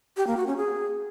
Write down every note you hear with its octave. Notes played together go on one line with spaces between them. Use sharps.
G4
A#3
F#4
C#4
G#4